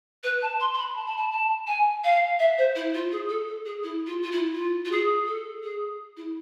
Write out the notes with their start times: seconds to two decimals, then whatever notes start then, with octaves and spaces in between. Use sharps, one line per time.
0.23 B4
0.42 A5
0.60 C6
0.73 C6
0.78 B5
0.95 A5
1.06 B5
1.17 A5
1.32 A5
1.67 G#5
2.04 F5
2.39 E5
2.58 C5
2.75 E4
2.94 F4
3.12 G#4
3.29 A4
3.47 A4
3.65 G#4
3.83 E4
4.06 F4
4.22 F4
4.31 E4
4.55 F4
4.85 F4
4.91 G#4
5.27 A4
5.63 G#4
6.17 E4